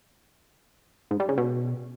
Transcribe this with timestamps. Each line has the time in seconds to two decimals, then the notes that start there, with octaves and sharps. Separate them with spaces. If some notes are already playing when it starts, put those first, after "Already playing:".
1.11 G#2
1.20 G3
1.29 C#3
1.38 B2